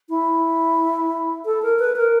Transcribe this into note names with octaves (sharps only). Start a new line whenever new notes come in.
E4
A4
A#4
B4
A#4